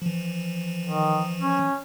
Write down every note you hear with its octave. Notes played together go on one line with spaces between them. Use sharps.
E3 F3
D#3
C#4